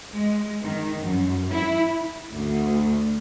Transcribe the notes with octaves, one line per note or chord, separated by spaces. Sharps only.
G#3
D#3
F#2
E4
D2